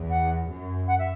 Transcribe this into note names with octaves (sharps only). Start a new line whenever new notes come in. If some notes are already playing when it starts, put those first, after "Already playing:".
Already playing: E2
F#5
F#2
F#5
E5